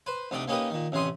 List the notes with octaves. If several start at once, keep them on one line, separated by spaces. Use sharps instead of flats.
B4 C5
D2 C3 D#4 D5 D#5 G5
A#3 C#4 D#4 G4 B4 D#5
A#2 D#3
A1 C3 C#4 C6 D#6